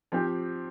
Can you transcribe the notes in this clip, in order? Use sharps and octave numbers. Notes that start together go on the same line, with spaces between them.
F3 C4 G4